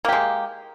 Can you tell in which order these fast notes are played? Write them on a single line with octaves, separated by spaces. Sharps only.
A#3 G4 G#3